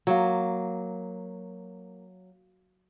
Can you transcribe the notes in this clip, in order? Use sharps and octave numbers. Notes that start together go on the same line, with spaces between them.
F#3 A#3